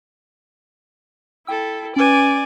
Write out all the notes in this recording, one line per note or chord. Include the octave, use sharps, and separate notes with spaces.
E4 A4 G5 E6
C#4 B4 D5 G#5